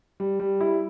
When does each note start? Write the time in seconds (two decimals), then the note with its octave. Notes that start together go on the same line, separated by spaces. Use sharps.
0.20 G3
0.40 G3
0.61 E4